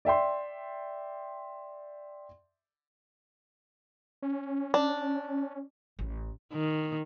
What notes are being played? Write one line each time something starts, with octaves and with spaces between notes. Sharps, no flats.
D5 E5 G5 C6
C#4
D4
A1
D#3